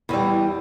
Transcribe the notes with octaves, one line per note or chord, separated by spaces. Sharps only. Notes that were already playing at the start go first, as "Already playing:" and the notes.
E2 E3 G3